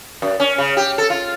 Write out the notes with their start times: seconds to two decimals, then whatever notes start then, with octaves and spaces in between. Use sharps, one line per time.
0.22 F#2
0.40 C#4
0.58 C#3
0.77 G4
0.98 A4
1.10 F4